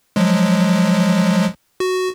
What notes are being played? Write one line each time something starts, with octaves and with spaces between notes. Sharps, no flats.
F3 F#3 G#3
F#4